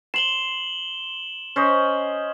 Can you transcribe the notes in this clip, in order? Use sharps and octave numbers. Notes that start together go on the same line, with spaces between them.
C6 E7 F#7 G7
C#4 C5 D#5